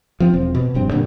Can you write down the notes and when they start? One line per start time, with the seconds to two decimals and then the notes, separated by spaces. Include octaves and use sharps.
0.20 F3 C4
0.33 E1 C4
0.55 B2
0.74 F1 G2 C4
0.91 G2 A#2 D3